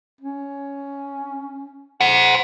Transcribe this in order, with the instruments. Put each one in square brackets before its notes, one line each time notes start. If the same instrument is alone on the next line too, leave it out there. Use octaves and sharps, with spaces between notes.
[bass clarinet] C#4
[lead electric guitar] C5 F#5